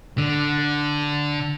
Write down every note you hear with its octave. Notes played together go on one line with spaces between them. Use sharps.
D3